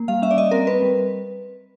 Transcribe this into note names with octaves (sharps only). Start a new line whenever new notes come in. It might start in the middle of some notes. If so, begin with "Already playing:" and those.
Already playing: A#3
G3 F5
C#4 E5
D5
G3 D#5
C4 A#4
C4 B4
G3